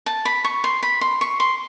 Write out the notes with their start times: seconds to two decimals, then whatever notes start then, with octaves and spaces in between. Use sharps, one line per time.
0.06 A5
0.25 B5
0.44 C#6
0.64 C6
0.83 B5
1.01 C6
1.21 C#6
1.40 C6